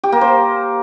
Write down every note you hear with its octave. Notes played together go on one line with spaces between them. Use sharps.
G4
A#3
C5